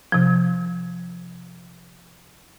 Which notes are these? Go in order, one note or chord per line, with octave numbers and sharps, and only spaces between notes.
C3 F3